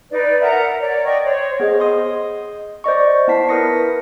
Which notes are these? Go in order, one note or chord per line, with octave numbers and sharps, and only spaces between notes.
D#4 B4 D5
A#4 E5 F#5 A#5
C#5 D5
D5 D#5 G5 C#6
C5 C#5
B3 G#4 C5 D#5
D#5 C6 D#6
C5 D5 D#5 C#6
B3 E4 A5 B6 C7
E4 A#4 B4 D#6 A#6 C#7